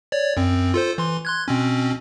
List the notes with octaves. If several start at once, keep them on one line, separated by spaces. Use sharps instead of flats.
C#5 D5
F#2 C4
F4 A4 C5
E3 C6
C6 F#6 G#6
B2 C4 C#4